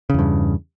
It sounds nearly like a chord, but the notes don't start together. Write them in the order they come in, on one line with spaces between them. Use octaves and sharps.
C#3 E2 G2